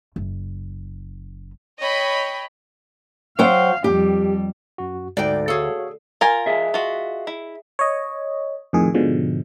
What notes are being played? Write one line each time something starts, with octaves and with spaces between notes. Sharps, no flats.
F#1
C#5 D#5 G5 B5
F#3 C5 F5 G5
F2 G3 G4
F#2 F#4
D2 G#2 D5 G5
F#4 G#4 A4 C#5 F5
F4 A#4 G#5
G#4 D#5 E5
F4 F#4
E4
C#5 D#5
F2 A2 D#3 G#4
G#2 B2 D3 F3 G#3